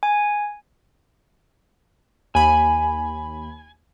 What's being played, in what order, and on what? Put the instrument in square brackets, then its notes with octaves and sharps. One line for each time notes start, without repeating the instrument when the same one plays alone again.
[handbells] G#5
[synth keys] D#2 B5 [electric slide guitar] G#5